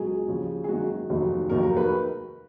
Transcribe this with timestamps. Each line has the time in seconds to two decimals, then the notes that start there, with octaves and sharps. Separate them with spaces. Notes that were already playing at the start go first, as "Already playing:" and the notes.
Already playing: C#2 B2 F#3 G#4
0.28 D#2 C#3 F3
0.64 G#4
0.69 G#1 F#2 D#3 F#4
1.10 F1 D#2 D#3 F#3
1.49 F1 D#2 D#3 F#3 A#4
1.63 A#4
1.77 B4